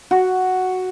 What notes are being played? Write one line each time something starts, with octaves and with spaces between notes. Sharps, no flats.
F#4